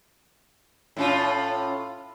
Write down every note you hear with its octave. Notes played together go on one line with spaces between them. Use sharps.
A2 C#4 F4